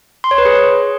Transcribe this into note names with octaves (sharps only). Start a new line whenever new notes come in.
C6
C#5
B4
G#4